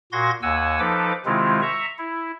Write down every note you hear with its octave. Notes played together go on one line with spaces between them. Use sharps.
A#2 F#4 C6 G#6 A#6
D#2 F#5 G#5 E6
F3 D#4 A4 B4 D6
C3 D#3 G#3 C4 E4 F4
E5 A#5 C#6
E4